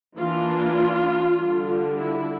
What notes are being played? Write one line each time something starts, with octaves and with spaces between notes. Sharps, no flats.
E3 A#3 D4 F4
D3 G3 D4
E4